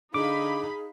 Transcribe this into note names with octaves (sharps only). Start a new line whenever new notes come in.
D3 D#4 G#4 F5 B5 D6